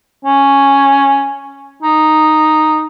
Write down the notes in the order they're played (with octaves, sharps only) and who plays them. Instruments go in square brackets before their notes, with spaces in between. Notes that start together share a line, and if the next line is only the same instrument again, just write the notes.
[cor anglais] C#4
D#4